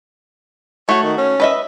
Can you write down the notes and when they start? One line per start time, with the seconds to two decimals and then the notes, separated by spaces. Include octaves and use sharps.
0.89 A3 F#4 C#5
1.03 D#3
1.18 C#4
1.40 B4 D#5 E5